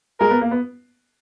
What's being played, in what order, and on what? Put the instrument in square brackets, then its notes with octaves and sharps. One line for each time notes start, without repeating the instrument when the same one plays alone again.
[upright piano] G#3 [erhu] A#4
[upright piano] B3
A#3
B3